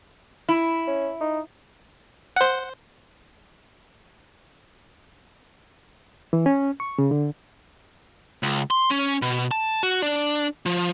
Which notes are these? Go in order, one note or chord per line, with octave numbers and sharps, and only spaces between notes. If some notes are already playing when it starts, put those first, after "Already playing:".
E4
C#4
D#4
C5 F#5
E3
C#4
C#6
C#3
D3
C#2
C6
C#4
B2
A5
F#4
D4
F3